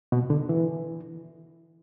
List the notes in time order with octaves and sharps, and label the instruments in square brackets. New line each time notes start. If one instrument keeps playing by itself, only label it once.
[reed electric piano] B2
D3
E3